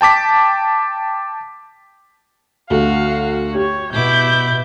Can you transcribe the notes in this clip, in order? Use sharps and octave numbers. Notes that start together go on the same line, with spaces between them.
G5 A5 D6 B6
D2 F#4 F5
G4 C#5
B2 E4 D6 G6